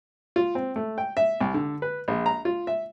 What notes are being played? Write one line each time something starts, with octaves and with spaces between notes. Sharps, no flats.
F4
C4
A3
G5
E5
C2
D3
B4
A#1
A#5
F4
E5